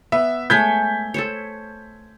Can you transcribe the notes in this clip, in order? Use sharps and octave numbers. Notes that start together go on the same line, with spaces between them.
B3 E5
G#3 A3 C#5 G6 G#6 B6
A4 C5 C#5